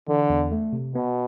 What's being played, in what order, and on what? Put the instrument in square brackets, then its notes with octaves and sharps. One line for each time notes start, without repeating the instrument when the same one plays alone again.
[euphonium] D3 [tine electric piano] E3
[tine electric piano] E2
A3
C3
[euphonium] B2 [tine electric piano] B3